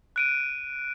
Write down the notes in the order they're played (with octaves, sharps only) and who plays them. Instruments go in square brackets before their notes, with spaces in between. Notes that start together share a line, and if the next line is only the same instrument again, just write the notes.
[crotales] F#6 D7 D#7